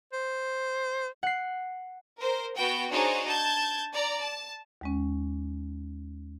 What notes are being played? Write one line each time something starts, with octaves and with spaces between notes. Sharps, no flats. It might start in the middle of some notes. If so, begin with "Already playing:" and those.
C5
F#5 C7
A#4 C5
B3 F#4 G5
D4 D#4 F#4 G#4 C5 C#5
A5 G6 G#6
D5 A#5
A5
D#2 G#3 C#4